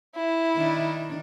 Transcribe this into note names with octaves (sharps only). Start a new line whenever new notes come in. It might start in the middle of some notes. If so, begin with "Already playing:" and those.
E4
D#3 D4